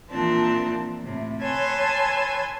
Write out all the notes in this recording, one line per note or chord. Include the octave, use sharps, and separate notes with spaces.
A#2 E3 F3 C4 D4 A5
A2 C3
B4 C#5 G#5 A5 C6 E6